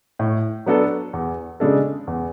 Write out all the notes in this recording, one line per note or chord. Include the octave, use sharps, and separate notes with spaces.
A2
F#3 B3 D4 A4
E2
C#3 G#3 D4 A4
E2